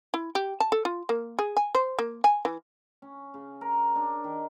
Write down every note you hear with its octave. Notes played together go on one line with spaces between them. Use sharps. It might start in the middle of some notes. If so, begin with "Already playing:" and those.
E4
G4
A5
A4
F4
A#3
G#4
G#5
C5
A#3
G#5
E3
C#4
C#3
A#4
D4
D#3